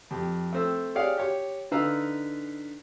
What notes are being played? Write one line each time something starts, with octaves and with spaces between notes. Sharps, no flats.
F2 G4
A3 C4 E6
G4 G#4 C#5 D5 F5 F#5
G4 C#5
D3 D#4 B4 F5 A#5 E6